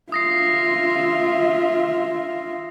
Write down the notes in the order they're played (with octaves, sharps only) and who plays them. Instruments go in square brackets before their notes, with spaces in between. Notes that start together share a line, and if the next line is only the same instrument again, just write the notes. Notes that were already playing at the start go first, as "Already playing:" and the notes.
[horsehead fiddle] F4 E5 [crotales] D#6 A#6 C7